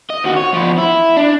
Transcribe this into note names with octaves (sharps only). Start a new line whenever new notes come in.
D#5
D#2 F#4
C#5
F3 B3
E4
D4